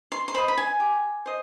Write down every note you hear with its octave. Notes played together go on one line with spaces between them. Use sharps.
C6
C6
C5 D#5 B5
B5
G#5
G4
C5 D#5